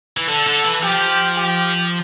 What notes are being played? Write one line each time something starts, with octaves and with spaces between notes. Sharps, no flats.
E3
D3 A4
D3
E3
F3 G4
G4